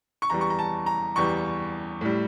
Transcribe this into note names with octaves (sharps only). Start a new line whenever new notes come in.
C#6
E2 E3 G3 A#5
C#6
A#5
A5
A#5
E2 E3 G3 C#6
A2 G3